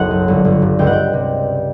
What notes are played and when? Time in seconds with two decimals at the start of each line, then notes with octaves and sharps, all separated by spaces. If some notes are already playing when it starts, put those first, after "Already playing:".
Already playing: F#1 B1 B2 F#5
0.11 F#2
0.28 G1
0.45 G1
0.62 G2
0.79 C#2 G5
0.87 F#5
0.93 C#2 G5
1.13 C3